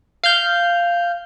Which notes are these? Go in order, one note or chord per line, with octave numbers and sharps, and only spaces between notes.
F5 F6 G6